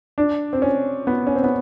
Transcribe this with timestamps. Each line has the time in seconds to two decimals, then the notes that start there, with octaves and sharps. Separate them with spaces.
0.18 D4
0.53 C4
0.62 C#4
1.07 B3
1.27 C#4
1.36 C4
1.44 B3